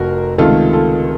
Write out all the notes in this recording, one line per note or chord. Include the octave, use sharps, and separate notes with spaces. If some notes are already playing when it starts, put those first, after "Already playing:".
Already playing: F1 F2 F#4 A#4
C#2 C3 D#3 A3 F4 A4
F4 A4